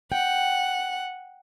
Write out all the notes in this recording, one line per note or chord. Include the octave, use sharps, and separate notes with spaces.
F#5 G5